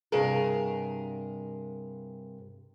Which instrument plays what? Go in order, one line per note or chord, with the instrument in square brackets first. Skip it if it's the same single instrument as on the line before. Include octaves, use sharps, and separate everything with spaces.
[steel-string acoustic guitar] G2 C3 G#4 A#4